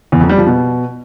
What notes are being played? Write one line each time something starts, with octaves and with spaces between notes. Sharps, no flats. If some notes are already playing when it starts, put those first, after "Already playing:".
E2
F2
G3
F3
B2